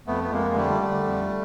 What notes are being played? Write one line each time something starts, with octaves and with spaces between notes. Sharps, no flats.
F2 A3 B3
B3
F2 G#3 A#3
G#3
D3 G3 A3
D3
F2